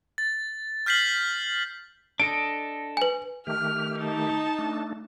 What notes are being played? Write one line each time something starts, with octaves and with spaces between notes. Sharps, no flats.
A6
F6 G6 B6 C7 F#7
D4 A4 D#5 D7
B4 G#5
D#3 A3 G4 F6
D#4 A5
A3 D4